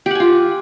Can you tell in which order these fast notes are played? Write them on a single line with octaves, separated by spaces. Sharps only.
G4 F#5 G#5 F4